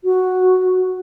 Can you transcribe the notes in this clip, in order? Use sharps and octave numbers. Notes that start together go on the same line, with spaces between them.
F#4